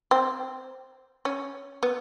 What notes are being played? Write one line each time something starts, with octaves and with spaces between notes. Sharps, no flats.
C4
C#4
B3